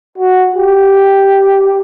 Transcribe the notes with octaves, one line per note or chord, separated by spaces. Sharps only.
F#4
G4